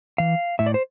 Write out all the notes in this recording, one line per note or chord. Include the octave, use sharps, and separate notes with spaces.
E3 F5
A2 E5
D5
C5